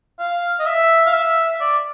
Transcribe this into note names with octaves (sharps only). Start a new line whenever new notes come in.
F5
D#5
E5
F5
E5
D5